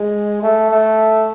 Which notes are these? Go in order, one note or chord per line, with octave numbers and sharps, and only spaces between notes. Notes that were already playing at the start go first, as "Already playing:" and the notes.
Already playing: G#3
A3
A3